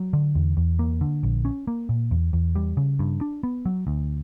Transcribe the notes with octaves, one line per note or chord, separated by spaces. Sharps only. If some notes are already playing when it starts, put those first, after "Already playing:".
Already playing: F#3
D3
E2
E2
A#3
D3
A#1
C#4
A#3
A#2
E2
E2
G3
C#3
G2
D4
B3
F#3
D2